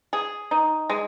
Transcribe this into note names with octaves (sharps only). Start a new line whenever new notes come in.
G#4
D#4
G#3